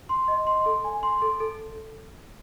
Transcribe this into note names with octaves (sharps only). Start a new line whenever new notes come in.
C6
D#5
C6
A4
G#5
C6
A4
A4